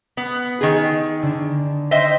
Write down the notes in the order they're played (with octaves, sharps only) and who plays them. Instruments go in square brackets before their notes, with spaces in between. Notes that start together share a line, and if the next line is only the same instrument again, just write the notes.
[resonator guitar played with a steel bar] B3
D#3 G#4
[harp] D3 D4
[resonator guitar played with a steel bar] C5 D#5 E5 [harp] G5 C6